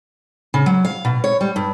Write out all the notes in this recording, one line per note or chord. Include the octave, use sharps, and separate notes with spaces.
C#3
F#3
F5
B2
C#5
G3
G2